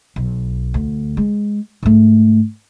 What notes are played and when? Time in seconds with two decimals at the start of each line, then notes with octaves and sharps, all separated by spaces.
0.16 B1
0.74 D2
1.17 G#3
1.83 G#2 A3